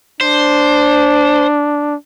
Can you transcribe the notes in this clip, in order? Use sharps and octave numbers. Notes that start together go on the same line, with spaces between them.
D4 C5